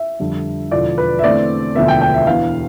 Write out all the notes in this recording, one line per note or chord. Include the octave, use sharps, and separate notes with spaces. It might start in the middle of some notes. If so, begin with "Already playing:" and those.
Already playing: E5
F2 D3 G3 D4
E1 E2 D3 F3 D5
B4
E5
E2 D3 A3 C4 D5
E1 D2 D3 F3 B3 E5
G5
G5
E5
E1 E2 B2 B3 D4 F5